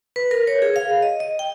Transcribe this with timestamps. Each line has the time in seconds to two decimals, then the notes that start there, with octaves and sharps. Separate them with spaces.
0.16 B4
0.31 A#4
0.47 C#5
0.62 G#4
0.76 F5
1.02 D#5
1.20 D#5
1.39 G5